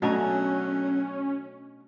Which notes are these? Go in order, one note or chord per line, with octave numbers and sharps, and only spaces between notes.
B2 F#3 A3 C#4 D4 F#4 G#5 A#5